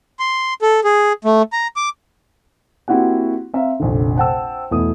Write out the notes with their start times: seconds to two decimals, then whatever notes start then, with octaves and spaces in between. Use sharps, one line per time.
0.19 C6
0.62 A4
0.84 G#4
1.25 A3
1.53 A#5
1.76 D6
2.88 A#3 C4 E4 F#4 G4 F#5
3.54 C4 E5 F5 A#5
3.80 F1 A#1 D3
4.16 C5 F#5 G5 A5 E6
4.71 E2 B2 A3 E4 D#6